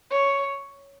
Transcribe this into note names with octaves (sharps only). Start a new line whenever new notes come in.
C#5